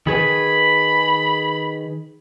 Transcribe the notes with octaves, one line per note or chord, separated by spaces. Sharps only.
D#3 G#4 B4 B5